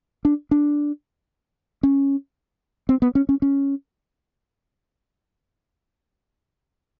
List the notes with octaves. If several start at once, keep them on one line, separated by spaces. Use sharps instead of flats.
D4
D4
C#4
C4
B3
C#4
C#4
C#4